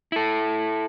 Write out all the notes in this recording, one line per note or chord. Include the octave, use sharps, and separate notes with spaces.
E4 A4